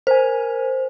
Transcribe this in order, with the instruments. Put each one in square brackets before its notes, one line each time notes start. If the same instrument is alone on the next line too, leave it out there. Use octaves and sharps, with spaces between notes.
[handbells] A#4 G#5 [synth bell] C5